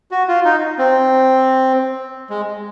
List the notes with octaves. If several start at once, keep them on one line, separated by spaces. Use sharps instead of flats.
F#4
F4
D#4
C4
G#3